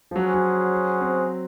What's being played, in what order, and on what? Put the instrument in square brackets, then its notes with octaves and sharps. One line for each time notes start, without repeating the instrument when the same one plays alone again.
[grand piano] F3
[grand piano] F#3 [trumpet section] C#4 G#4 C5 F#5
[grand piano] F#3
C4